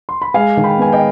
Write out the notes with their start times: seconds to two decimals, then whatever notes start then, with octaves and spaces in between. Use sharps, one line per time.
0.09 C6
0.22 B5
0.34 G#3 F5 G#5
0.57 D#3
0.64 G5 B5
0.78 B3 G#5
0.93 D#5 G5